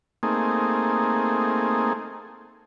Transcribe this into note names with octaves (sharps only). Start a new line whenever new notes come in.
A3 A#3 C4 D#4 G#4